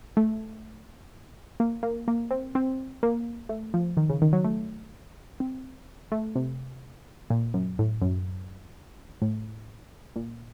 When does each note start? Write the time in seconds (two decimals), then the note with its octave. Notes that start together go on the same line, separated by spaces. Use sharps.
0.17 A3
1.60 A#3
1.83 A#3
2.08 A#3
2.31 C4
2.55 C4
3.03 A#3
3.49 A3
3.74 F3
3.97 D#3
4.10 C#3
4.22 D#3
4.33 F#3
4.44 A3
5.40 C4
6.12 A3
6.36 C3
7.30 A#2
7.54 F#2
7.79 A2
8.02 F#2
9.22 A2
10.16 A#2